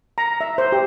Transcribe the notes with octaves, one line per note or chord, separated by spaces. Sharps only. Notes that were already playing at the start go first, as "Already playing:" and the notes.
A#5
E5
C5
G4